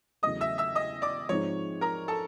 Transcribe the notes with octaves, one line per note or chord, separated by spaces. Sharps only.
E2 C#3 F#3 A3 D#5 D#6
E5 E6
E5 E6
D#5 D#6
D5 D6
G#2 F3 G#3 C4 D#4 C#5 C#6
A#4 A#5
A4 A5